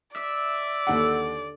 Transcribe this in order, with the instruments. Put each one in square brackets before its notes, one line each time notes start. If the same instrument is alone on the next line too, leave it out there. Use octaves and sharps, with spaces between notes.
[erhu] D5 [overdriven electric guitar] E5
[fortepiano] D#2 F#5 [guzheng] D3 B5